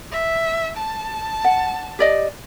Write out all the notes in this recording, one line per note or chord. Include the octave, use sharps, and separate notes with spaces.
E5
A5
F#5
G4 D5 D#5